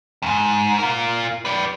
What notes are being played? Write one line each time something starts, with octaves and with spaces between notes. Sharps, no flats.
F2 G#2
F4 A#4
B4 D5